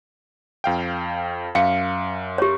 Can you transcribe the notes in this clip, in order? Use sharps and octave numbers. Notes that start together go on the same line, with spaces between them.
F2 F5 G5
F#2 F5 C#7
G4 C#5